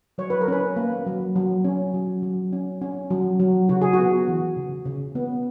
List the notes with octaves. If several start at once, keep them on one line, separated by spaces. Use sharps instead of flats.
F#3 C#5
B4
A#4
C#4 B4
A#3
F#3
F#3
C#4
F#3
F#3
C#4
C#4
F#3
F#3
C#3 F#4
G#4
F#4
B3
E3
C#3
C#3
B3